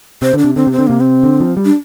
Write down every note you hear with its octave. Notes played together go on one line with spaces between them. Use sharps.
C3 C5
D3 D4
C3
D3 C4
C3
C4
D3
C3 A#3
C4
D3
F3
G3
D4